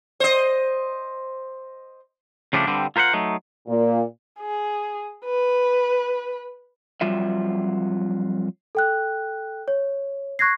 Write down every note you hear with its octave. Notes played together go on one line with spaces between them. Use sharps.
C5 D#5
C#3 F3 G3 A3 B3 D4
G2 D3 G3 C4
F4 A#4 C5 E5 F#5
F#3 A3 D#4
A#2
G#4
B4
F2 F#3 G3 F4 E5
A4 G5 F#6
C#5
C#6 F#6 G#6 A#6 C7